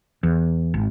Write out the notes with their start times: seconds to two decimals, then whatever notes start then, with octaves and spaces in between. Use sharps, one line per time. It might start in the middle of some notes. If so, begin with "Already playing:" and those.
0.23 E2
0.74 G#1